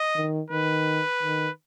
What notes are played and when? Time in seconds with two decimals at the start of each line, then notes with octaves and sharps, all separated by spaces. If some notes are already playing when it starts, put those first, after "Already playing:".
Already playing: D#5
0.16 D#3
0.50 D#3 B4
1.23 D#3